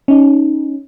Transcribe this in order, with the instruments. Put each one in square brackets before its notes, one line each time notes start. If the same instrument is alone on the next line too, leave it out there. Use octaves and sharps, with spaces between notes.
[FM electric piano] C#4 D#4